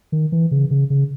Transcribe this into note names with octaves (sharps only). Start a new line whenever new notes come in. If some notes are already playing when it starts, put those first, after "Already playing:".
D#3
E3
C#3
C#3
C#3